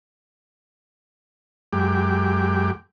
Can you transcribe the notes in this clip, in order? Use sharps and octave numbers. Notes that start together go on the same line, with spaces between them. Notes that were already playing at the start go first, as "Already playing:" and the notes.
F#2 G#3 G4 D6